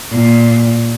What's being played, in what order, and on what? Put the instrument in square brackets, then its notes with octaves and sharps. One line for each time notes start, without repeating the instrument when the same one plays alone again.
[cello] A#2